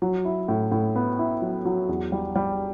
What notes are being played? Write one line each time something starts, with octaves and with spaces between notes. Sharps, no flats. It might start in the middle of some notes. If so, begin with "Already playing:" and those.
F#3
E4
A2
A2
B3
E4
F#3
F#3
E2
G3
G3